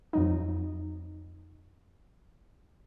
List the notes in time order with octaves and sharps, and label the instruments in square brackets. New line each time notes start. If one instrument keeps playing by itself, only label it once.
[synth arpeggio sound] F2 F#3 D#4